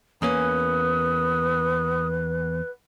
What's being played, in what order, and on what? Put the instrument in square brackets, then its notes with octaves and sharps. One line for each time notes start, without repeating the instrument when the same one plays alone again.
[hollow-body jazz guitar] E2 A#3 C#4 [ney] B4 [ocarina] D#6